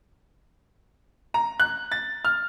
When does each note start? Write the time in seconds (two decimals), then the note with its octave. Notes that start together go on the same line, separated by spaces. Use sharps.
1.34 A#5
1.60 F#6
1.92 A6
2.25 F6